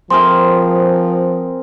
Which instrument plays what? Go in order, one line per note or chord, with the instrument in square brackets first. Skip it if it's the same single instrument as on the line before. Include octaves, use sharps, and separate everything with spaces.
[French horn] F3 [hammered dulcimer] C4 G#4 A#4 [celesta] C6